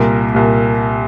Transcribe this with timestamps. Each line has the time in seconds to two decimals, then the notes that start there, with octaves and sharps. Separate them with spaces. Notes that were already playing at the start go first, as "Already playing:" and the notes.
Already playing: C2 A#2 A#4
0.34 C2 A#2